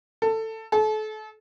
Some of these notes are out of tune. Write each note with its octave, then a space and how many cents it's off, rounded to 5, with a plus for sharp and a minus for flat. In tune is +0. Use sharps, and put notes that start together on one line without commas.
A4 +15
A4 -35